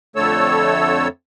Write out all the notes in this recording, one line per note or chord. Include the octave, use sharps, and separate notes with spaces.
F2 D3 A3 A4 C#5 E6